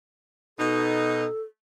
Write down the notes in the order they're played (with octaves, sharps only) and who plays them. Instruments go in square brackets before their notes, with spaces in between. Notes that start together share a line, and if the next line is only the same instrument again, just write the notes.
[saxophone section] B2 D#4 [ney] A4